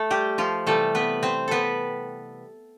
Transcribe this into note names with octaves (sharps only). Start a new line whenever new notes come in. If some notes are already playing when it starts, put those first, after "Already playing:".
Already playing: A3 A4
G3 G4
F3 F4
C3 E3 G3 A3 A4
B3 B4
C4 C5
B3 A4 B4